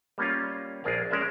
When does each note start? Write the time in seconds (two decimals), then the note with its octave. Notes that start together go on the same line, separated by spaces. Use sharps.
0.18 G3 A#3 C#4 F4
0.84 A#1 F4 G#4 A#4 F5
1.11 G#3 C#4 A#4 D5 E5